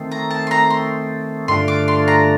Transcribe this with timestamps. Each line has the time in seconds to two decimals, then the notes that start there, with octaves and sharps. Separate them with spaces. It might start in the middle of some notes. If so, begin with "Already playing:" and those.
Already playing: D#3 A3 C4
0.11 A#5
0.31 A5
0.47 C6
0.51 A#5
0.70 C6
1.48 G2 D3 A3 D4 F4 C6
1.68 D6
1.88 C6
2.08 A#5